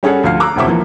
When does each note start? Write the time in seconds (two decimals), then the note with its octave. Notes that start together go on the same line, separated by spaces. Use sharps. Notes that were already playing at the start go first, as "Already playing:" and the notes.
0.03 G3 C#4 G#4 A4 F#5
0.24 D2 F3 F5 F6 C7
0.40 A#5 D6 E6 F#6
0.56 E1 D2 C4 E4 E5 D6
0.67 E3 F3 A#3